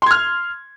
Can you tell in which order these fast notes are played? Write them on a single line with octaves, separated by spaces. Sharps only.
C6 G#6 F6